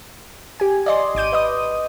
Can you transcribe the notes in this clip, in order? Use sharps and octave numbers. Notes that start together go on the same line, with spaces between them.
G4 G#5
D5 D#5 C6
G#1 D6 G6 D#7
B4 D#5 D#6